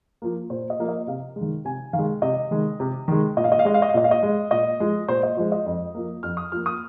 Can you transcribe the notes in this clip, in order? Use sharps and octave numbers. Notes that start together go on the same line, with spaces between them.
F3 A#3
A#2 C5
D#5
F3 A#3
D#5
C3 F5
G#3
D#3
C3 G#5
D#3 F5
G#3
C3 D#5
D#3 G#3
C3
D#3 G#3
A#2 D#5
F5
D#5
F5
G#3 D#5
F5
D#5
F5
A#2 D#5
F5
D#5
G#3
A#2 D#5
F3 G#3
A#2 C5
D#5
F3 G#3 C5
D#5
F2
F3 A#3
F2 F6
D#6
F3 A#3 F6
D#6